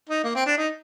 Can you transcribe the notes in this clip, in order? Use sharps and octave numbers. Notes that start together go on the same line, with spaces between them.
D#4
A#3
C4
D4
D#4